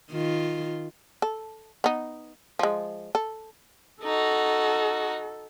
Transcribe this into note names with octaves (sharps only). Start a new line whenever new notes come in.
D#3 F4
A4
B3 D#4
F3 G#3
A4
D#4 F#4 A4